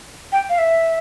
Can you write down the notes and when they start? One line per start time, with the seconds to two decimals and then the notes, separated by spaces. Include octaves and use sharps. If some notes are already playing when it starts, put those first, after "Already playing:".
0.32 G5
0.49 F5
0.58 E5